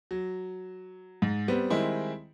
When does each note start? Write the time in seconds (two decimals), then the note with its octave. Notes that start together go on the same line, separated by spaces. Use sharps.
0.11 F#3
1.22 G#2
1.48 G3 B3 C4
1.70 D#3 G3 G#3 C4 E4